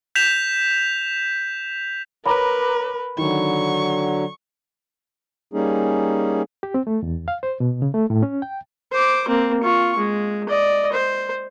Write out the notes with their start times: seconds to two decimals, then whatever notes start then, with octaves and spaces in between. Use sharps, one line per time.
0.15 G6 B6 E7 F7
2.26 A#4 B4 C#5 A#5 B5 D6
3.18 D3 D#3 F#3 C#6
5.54 G3 A#3 C#4 D#4 G#4
6.63 G4
6.74 C4
6.87 A3
7.03 E2
7.28 F5
7.43 C5
7.60 B2
7.82 C#3
7.94 A3
8.10 A2
8.23 C#4
8.42 G5
8.92 C5 D6
9.28 A#3 C4
9.63 F4 C#6
9.98 G#3
10.49 D5 D#5
10.92 C5